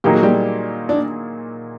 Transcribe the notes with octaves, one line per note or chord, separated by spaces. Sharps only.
A#2 F#3 A#3 D#4 G4 G#4
F#4
G3 G4
D4